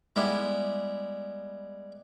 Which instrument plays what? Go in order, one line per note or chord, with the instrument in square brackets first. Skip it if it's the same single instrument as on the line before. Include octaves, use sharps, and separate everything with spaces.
[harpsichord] G3 G#3 B3 E4